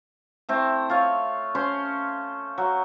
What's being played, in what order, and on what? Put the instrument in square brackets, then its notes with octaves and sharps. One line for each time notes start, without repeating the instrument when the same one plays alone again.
[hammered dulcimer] A3 C4 E4
F4 C#5
C#4 C5 C6
F#3